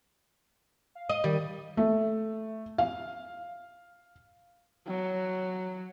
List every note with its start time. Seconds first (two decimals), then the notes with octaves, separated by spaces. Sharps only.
0.95 F5
1.09 D#5
1.24 D#3 G3
1.77 A3
2.78 F5
4.87 F#3